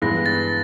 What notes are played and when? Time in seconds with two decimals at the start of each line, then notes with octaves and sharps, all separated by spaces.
0.02 G2 E3 G#3 B3 A#6
0.26 A6